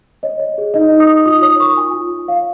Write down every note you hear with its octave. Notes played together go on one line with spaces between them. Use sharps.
C#5 D#5
C#5
G#4
D#4 D#5
D#4
D#6
D#4
F4 D#6
C#5 D#6
A#4 C#6
F4 G#5
F4
F4
C#5 F5